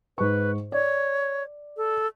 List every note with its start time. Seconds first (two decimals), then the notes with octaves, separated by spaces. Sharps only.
0.18 G#2 B4 C#6
0.72 C#5 D5
1.77 A4